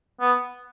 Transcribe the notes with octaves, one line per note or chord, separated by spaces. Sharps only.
B3